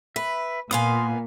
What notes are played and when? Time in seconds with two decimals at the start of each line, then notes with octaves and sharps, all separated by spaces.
0.16 B4 E5
0.71 A#2 B3 F5 G#5 C6 D#6